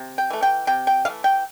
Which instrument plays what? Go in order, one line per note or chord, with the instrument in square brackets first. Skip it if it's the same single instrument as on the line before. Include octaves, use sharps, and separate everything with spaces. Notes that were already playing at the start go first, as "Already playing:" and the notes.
Already playing: [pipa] C3
G5
E3 A3
G5
C3 G5
G5
E3 A3 F5
G5